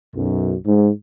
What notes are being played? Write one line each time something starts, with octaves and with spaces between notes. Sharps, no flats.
B1 F#2
G#2